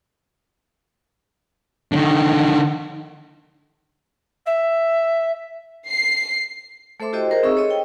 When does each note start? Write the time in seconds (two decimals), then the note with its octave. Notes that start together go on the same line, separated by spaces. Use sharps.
1.92 D3 D#3
4.46 E5
5.88 C7
7.00 A3 A4 C5 E5 C6 D6
7.13 E4 F#4 G4 C5 D#5 G5
7.31 G#4 A#4 C5 D#5 A#5
7.43 C4 D#4 G#4 E5 C#6 E6
7.55 A4 C#5 D#5
7.70 G5